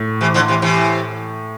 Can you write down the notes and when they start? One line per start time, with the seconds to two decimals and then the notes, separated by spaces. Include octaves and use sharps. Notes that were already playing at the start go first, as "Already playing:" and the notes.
Already playing: A2
0.21 C3 E3
0.34 D3 F3
0.48 C3 E3
0.62 C3 E3